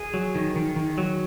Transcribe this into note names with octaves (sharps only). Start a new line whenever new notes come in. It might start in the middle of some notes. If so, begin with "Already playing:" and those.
Already playing: G#4
F#3
D#3
D#3
D#3
F#3